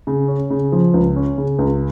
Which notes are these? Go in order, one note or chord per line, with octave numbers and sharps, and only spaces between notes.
C#3
C#4
C#3
F3
C#2
C#4
C#3
C#2